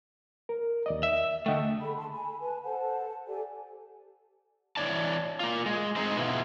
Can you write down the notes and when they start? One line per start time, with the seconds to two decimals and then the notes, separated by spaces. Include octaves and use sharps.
0.49 A#4
0.86 D#2 D5 D#5
1.03 E5
1.46 D3 A3 D#5 F#5 G5
1.80 G#4 A4 B5
1.96 A5 C6
2.13 G#5 B5
2.40 B4 G#5 A5
2.64 A4 C5 F#5 A5
3.27 G4 A4 D5 G#5
4.76 E3 G3 C#5 D5 A5
5.40 A#3 F4
5.66 G#3
5.96 G#3 C4 D#4 C5
6.16 B2 B3 E4 F4